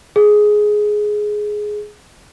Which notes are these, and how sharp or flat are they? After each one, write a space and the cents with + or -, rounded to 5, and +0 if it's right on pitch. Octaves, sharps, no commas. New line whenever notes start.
G#4 +10